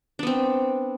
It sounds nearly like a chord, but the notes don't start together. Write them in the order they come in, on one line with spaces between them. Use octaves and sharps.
D4 B3 C4